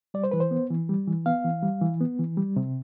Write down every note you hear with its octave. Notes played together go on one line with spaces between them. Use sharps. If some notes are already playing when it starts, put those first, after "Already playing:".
G3 D5
C5
E3 B4
C5
B3
E3
G3
E3
B3 F5
E3
G3
E3
B3
E3
G3
C3